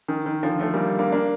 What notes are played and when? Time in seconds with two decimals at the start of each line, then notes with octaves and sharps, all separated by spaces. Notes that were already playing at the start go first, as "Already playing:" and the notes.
0.08 D#3
0.26 D#3
0.43 D3 F3
0.60 F3 A3
0.74 G3 A#3
0.99 A#3 D4
1.12 A#3 D4